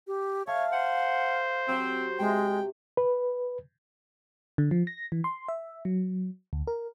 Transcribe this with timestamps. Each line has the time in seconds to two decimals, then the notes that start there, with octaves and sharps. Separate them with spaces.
0.07 G4
0.47 A4 C#5 E5 F5
0.72 C5 F#5
1.68 F#3 C4 G4
2.19 C3 G#3 G5
2.97 B4
4.58 D3
4.71 F3
4.87 A#6
5.12 E3
5.24 C6
5.48 E5
5.85 F#3
6.53 D2
6.67 A#4